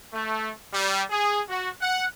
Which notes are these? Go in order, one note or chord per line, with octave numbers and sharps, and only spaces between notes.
A3
G3
G#4
F#4
F#5